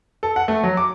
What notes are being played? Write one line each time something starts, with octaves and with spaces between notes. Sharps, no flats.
A4
F#5
A3
F#3
D6